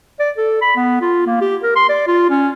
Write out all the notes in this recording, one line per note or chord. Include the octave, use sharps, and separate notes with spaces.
D5
A4
B5
B3
F4
A#3
G4
A#4
C6
D5
F4
C#4